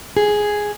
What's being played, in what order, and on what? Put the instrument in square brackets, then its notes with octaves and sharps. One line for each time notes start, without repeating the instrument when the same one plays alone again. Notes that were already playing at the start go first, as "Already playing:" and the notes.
[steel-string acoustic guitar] G#4